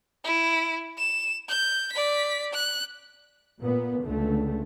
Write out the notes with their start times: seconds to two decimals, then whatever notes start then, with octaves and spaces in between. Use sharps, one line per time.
0.24 E4
0.98 E7
1.49 G6
1.93 D5 B6
2.54 F#6
3.59 A#2 B3
4.04 C#2 D3 A3